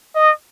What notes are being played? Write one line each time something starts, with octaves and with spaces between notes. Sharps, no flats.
D#5